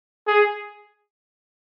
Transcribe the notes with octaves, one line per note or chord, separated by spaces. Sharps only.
G#4